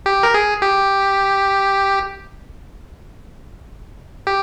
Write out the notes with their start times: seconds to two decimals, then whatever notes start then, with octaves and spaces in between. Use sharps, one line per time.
0.06 G4
0.23 A#4
0.34 G#4
0.62 G4
4.27 G4